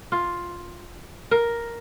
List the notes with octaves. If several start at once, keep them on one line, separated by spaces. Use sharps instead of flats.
F4
A#4